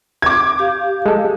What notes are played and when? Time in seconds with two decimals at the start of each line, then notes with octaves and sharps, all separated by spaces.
0.22 D6 G#6
0.59 G4 F5
1.06 G#3 A4